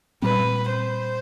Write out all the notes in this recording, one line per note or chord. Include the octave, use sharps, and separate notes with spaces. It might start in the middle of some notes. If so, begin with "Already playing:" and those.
A#2 G3 C4 B4
C5